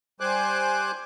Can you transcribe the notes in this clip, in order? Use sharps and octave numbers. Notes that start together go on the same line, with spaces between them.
G3 C5 G#5 D6 F#6